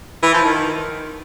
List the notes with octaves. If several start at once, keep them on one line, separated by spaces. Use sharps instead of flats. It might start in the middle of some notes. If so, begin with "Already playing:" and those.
E3
F3
D#3